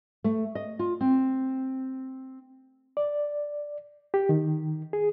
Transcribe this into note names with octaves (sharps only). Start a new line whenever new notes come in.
A3
D#5
F4
C4
D5
G4
D#3
G#4